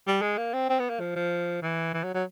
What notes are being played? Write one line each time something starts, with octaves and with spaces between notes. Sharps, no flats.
G3
G#3
A#3
C4
C4
B3
A#3
F3
F3
E3
E3
F#3
F#3